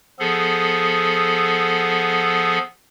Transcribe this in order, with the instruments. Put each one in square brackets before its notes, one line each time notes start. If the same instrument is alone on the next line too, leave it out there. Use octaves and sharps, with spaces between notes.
[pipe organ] F3 B3 G#4 A4